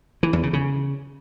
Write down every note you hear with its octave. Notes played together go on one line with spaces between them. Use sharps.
E3
E2
C#3
C#3